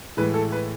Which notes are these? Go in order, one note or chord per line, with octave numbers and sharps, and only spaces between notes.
A2 E3 G#3 B4
A4
B4